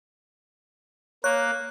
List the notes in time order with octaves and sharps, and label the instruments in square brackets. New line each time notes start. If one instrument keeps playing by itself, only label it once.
[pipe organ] A#3 [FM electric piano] C#5 [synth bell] F#6